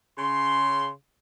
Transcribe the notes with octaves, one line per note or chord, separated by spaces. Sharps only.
C#3 C6